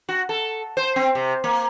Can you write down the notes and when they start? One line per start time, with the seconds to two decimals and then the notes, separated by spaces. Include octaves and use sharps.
0.09 F#4
0.29 A4
0.77 C5
0.96 C4
1.15 C3
1.44 A#3